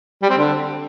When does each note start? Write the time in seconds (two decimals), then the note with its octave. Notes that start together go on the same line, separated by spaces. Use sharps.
0.23 G3
0.30 C4
0.37 D3